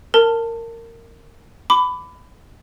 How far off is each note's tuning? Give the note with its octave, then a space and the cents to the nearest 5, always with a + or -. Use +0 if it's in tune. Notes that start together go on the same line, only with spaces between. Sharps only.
A#4 -20 A5 +20
B5 +20 D6 +0